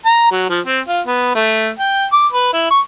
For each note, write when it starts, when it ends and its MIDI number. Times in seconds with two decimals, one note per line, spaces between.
0.05 0.29 82
0.31 0.48 54
0.50 0.60 53
0.67 0.80 60
0.88 1.01 65
1.07 1.31 59
1.35 1.70 57
1.79 2.06 79
2.13 2.27 86
2.32 2.52 71
2.53 2.68 64
2.71 2.81 85